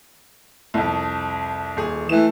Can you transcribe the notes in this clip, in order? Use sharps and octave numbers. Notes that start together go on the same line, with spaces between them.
C2 F2
D#1 G#4
E3 A3 E7